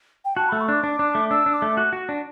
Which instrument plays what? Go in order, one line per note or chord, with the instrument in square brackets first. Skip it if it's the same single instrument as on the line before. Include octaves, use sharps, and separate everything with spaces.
[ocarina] G5
[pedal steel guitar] F#4 [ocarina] A5
[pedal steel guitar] A3 [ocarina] B5
[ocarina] C#6
[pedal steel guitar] D4 [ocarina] D6
[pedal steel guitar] D4
D4
A3
[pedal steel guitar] D4 [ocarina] E6
[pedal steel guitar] D4
[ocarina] D6
[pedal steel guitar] A3
F#4
F#4
D4